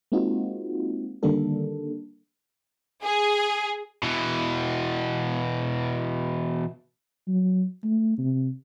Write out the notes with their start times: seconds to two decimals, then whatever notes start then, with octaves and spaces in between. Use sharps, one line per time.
0.12 G#3 A#3 C4 D#4 F4 F#4
1.23 D3 D#3 G3 A#3 D4 A4
3.03 G#4
4.03 B2 E3
7.28 F#3
7.83 A3
8.18 C3